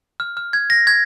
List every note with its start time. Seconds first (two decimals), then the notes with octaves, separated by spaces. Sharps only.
0.20 F6
0.37 F6
0.53 G#6
0.70 A#6
0.87 G#6